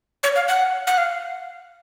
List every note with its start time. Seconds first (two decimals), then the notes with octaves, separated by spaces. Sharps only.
0.23 C#5
0.36 F5
0.48 F#5
0.87 F#5
0.98 F5